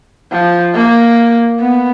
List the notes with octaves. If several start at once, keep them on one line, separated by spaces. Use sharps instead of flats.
F3
A#3
B3